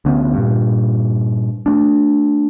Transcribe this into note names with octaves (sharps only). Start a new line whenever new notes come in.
D2 D3 B3 C#4
G2 A#2
A3 D4